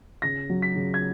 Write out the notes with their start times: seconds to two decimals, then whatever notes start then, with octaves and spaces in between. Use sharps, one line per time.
0.22 C#3 A#6
0.50 F#3
0.62 B6
0.76 C#3
0.94 G#6